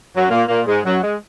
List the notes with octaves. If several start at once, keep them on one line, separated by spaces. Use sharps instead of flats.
F#2 F#3
A#2 A#3
A#2 A#3
G#2 G#3
F#2 F#3
G#3